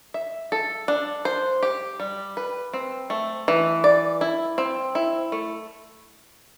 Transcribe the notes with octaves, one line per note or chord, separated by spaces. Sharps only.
E5
A4
D4
C5
G4
G3
B4
C4
A3
E3
D5
E4
C4
E4
A3